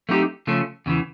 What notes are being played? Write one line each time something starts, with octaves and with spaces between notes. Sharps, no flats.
F#3 A3 C4 D#4 G4
C#3 F3 A3 C#4
E2 C#3 E3